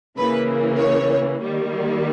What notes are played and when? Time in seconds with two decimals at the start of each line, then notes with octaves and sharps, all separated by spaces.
0.17 C#3 E3 A#3 B4
0.79 C#5
1.40 D#3 G3 A#3